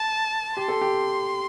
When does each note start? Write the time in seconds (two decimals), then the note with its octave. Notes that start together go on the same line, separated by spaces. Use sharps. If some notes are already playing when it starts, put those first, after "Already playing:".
Already playing: A5
0.56 G4 C6
0.68 A4
0.81 G4